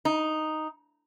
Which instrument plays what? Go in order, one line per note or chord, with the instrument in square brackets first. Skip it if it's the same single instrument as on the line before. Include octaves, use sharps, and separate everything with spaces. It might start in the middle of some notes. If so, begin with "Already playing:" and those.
[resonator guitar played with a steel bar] D#4